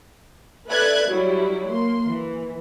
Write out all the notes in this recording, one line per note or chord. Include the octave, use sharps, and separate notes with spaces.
A4 B4 D5 E5 F#6 G#6
F#3 G3 E4
A#3 C6
E3